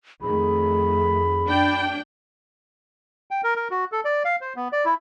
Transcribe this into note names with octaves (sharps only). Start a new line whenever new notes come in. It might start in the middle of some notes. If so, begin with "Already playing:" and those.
F2 D#3 A3 G#4 B5
F#2 D4 G5
G5
A#4
A#4
F#4
A4
D5
F5
C5
B3
D5
E4